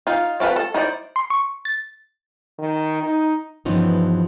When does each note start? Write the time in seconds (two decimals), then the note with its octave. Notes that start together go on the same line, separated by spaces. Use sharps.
0.07 D#4 F4
0.40 C4 F4 A4 B4
0.56 A4
0.74 D#4 E4 C5 D5
1.16 C6
1.30 C#6
1.65 A6
2.59 D#3
3.03 D#4
3.65 G2 E3 F3 B3 C#4 D#4